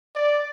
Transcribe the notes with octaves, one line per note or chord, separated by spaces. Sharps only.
D5